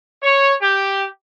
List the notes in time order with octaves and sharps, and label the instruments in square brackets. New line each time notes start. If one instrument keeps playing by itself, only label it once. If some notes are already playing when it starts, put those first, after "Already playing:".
[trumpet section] C#5
G4